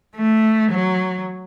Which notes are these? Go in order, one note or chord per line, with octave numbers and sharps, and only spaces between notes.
A3
F#3